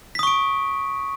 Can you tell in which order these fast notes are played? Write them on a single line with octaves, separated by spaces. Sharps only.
B6 D#6 C#6 D7